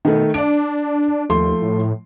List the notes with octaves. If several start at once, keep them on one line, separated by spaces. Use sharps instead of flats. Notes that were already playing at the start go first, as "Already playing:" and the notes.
B2 D#3 A3
D4 D5 D7
D#2 F3 A3 C6
A2